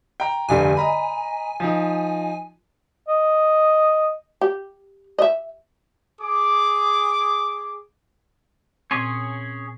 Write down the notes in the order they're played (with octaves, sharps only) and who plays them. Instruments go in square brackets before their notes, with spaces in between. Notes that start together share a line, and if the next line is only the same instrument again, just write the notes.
[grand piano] G5 A#5
[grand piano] F1 G2 D3 [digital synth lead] G#5
[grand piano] D#5 A#5 B5
F3 D#4
[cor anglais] D#5
[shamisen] G4
D#5 E5
[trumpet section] G#4 D6
[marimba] A#2 C4 [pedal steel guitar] C#4 G#4 C#5